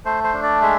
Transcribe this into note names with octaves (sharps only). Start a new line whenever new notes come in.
A3 C5
C5
D4
D5
G#3 E5